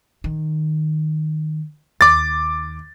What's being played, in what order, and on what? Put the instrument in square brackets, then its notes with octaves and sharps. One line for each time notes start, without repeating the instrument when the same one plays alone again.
[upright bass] D#3
[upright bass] D#2 [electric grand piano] D6 A6